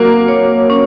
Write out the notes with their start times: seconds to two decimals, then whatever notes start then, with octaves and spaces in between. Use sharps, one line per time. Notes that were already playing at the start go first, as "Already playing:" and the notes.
Already playing: F#3 A#3 F#4
0.28 C#5
0.70 C#4